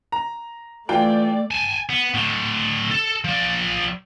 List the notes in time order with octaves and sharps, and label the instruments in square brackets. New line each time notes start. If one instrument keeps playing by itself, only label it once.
[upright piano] A#5
[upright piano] E3 F4 G5 [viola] A3 D5
[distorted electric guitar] G#5 A5
B3
A2 D3
A4
F3 D5